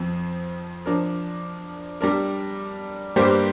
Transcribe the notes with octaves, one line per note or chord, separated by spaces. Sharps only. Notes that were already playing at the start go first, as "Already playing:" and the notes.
Already playing: F2 F3 C4
F3 D4 A#4
G3 D4 A#4
G2 G3 A#3 G4 C5